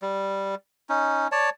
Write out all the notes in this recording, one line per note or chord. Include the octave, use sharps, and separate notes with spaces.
G3
C#4 D#4
C#5 D5 A5